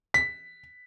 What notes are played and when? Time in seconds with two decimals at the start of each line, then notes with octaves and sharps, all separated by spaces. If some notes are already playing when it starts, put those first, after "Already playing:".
0.14 B6